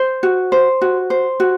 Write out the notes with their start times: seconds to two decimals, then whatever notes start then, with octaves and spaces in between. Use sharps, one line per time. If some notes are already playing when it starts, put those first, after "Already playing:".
Already playing: C5
0.23 F#4
0.52 C5
0.82 F#4
1.10 C5
1.40 F#4